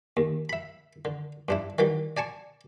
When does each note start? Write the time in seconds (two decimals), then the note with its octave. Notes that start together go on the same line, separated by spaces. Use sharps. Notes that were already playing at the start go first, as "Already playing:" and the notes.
0.17 D#2
0.49 E5 B5
1.05 D3
1.49 G2 D4 E4
1.79 D#3 E3 F#3 G3
2.17 D5 G#5 A5 C#6